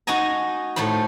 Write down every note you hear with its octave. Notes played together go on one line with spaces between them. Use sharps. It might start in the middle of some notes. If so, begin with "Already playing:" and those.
D#4 F#4 D#5 G#5 A#5
A2 A3 D#4 C5 B5